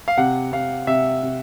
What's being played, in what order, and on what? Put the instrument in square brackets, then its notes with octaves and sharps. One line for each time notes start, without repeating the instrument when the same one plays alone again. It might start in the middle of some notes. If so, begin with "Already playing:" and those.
[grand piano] F5
C3 F#5
C3 F5
C3 E5
C3